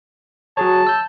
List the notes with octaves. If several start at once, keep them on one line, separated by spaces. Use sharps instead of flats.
F#3 G#4 C#5 A5
E6 G6